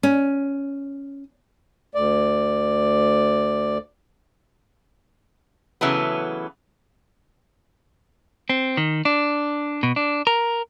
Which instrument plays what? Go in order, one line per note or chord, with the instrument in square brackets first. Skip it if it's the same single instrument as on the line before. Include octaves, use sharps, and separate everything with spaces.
[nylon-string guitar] C#4
[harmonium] D2 D5
[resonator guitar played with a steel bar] C#3 E3 F#3 A3 B3
[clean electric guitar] C4
D#3
D4
B2
D4
A#4